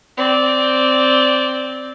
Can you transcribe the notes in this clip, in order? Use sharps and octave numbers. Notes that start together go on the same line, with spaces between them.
C4 D5